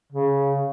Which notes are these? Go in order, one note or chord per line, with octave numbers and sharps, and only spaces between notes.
C#3